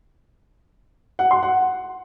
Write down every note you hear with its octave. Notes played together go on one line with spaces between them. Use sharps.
F#5
C6
F#5